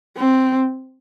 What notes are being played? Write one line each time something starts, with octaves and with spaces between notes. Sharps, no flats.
C4